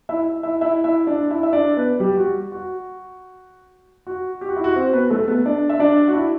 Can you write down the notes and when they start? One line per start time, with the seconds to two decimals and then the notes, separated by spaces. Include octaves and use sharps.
0.09 E4 E5
0.43 E4 E5
0.61 E4 E5
0.84 E4 E5
1.07 D4 D5
1.31 E4 E5
1.43 E5
1.53 D4 D5
1.77 B3 B4
2.00 G3 G4
2.17 F#4
2.52 F#4
4.07 F#4
4.41 G4
4.49 F#4
4.56 E4
4.64 F#4
4.76 C4 C5
4.93 B3 B4
5.10 A3 A4
5.28 B3 B4
5.45 D4 D5
5.70 E5
5.80 D4 D5
6.08 F#4
6.14 E4